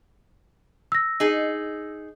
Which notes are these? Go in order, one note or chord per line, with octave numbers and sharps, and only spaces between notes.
E6 A#6
D#4 G#4